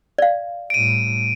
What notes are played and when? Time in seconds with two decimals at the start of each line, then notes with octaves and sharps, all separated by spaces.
0.18 D5 F5
0.70 A2 G3 D7 D#7